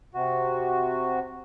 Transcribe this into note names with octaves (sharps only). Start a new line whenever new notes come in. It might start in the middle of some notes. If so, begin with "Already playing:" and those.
C3 F#4